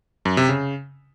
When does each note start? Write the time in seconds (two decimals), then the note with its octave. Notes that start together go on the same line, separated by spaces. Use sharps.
0.25 F#2
0.37 C3
0.49 C#3